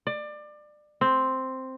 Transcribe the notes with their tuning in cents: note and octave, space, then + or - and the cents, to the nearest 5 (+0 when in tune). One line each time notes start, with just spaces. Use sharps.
D5 +25
C4 +0